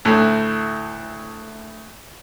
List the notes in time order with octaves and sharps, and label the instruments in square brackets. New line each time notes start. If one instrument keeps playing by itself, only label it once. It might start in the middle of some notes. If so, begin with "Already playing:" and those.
[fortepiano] D2 A2